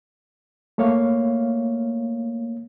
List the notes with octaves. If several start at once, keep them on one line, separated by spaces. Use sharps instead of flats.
A3 A#3 C#5 F5